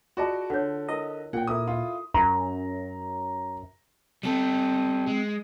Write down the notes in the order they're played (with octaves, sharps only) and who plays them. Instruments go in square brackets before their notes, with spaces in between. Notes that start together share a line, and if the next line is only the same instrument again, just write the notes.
[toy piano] F4 G#4 A5 [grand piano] F#4 D5 D#5
[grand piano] D3 [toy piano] C#5 F#5
[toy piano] E4 A#4 [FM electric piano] D#5
[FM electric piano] A#2 [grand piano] F#5 G5
[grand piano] E4 A#4 D#6 [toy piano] A4
[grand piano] E4 F4
[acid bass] F#2 [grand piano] A#5
[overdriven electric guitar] G3 A4 [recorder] C4
[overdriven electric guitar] G#3